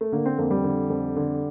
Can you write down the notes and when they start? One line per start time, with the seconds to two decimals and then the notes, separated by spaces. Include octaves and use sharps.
0.01 A3
0.12 D3 A#3
0.25 C4
0.38 F2 A#3
0.51 G3
0.64 D3
0.90 F2
1.16 D3